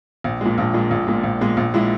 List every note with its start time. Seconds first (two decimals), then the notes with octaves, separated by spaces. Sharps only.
0.24 A#1
0.41 A#2 G#3
0.58 A#1
0.74 A#2 G#3
0.91 A#1
1.07 A#2 G#3
1.23 A#1
1.41 A#2 G#3
1.57 A#1
1.74 A#2 G#3 E4